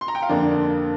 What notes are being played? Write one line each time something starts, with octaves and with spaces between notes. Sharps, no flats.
C6
A#5
G5
F5
F2 D3 A#3 D4 D5